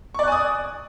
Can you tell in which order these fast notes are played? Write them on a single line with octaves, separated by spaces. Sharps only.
C#6 D5 F#6 G#5 D#6